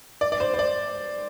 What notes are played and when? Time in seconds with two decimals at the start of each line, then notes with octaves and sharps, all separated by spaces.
0.21 D5
0.32 D5
0.40 C5
0.54 C5
0.59 D5